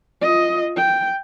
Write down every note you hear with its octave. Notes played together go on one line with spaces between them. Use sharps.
F4 D#5
G5